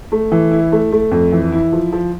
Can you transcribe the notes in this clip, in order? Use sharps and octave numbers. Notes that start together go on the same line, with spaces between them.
A3
E3
E4
A3
A3
F2
E3
E4
F3
F3